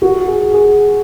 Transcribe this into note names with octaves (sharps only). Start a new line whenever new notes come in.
F#4
G#4
G#4